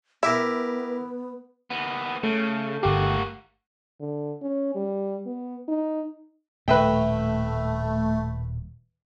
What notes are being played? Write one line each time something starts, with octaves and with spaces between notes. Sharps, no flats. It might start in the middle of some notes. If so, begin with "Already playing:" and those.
B3 E4 G4 A#4 E5
D#2 B3
C#3 A3
G1 A#3 F#4 G4
D3
C#4
G3
B3
D#4
D#1 A2 A3 B4 E5 G5